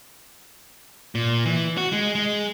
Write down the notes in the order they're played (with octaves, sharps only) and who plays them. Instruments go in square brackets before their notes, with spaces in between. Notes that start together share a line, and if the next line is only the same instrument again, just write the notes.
[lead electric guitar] A#2
E3
F#4
G#3
G#3